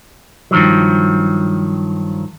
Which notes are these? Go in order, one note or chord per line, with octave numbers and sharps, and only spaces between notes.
G2 D#3 F3 F#3